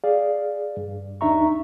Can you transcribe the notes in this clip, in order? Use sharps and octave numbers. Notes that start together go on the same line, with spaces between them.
G#4 D5 F5
G2
D#2 D4 D#4 E5 A#5 C#6